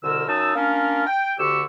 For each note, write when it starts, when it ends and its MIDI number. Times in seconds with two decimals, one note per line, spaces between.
0.03 0.26 36
0.03 0.26 47
0.03 0.26 50
0.03 0.26 70
0.03 0.26 88
0.27 0.54 42
0.27 0.54 63
0.27 0.54 81
0.27 0.54 87
0.27 0.54 88
0.55 1.06 58
0.55 1.06 61
0.55 1.06 62
0.55 1.06 65
0.55 1.06 70
1.06 1.33 79
1.38 1.61 38
1.38 1.61 50
1.38 1.61 67
1.38 1.61 85
1.38 1.61 88